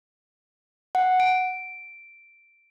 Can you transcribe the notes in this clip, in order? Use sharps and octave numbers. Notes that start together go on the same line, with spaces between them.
F#5
D7